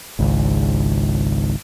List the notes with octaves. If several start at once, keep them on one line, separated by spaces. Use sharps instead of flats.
G#1 C#2